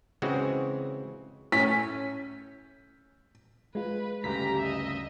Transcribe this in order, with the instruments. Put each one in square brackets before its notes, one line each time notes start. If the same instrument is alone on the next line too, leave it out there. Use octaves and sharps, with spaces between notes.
[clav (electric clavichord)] C#3 E3 G#3 C4 F#4
[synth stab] A2 C#4 [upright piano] B6
[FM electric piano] G#3 F4 [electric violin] B4
[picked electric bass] D2 G2 C#3 [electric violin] G4 A#5 [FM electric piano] B6
[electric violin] D#5 E5